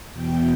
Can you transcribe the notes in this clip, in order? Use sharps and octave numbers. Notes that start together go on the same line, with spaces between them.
E2 B2 G5